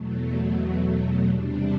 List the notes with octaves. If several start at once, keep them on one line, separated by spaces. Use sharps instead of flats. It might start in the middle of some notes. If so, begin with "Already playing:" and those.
Already playing: E2 B2 F#3 A3
E2 C3 G3 D4